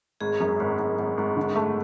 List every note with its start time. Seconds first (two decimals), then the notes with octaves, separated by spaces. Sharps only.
0.21 G#1 G#4
0.40 F#2
0.60 G#1
0.79 G#1
0.99 G#1
1.17 G#1
1.37 D3
1.56 A3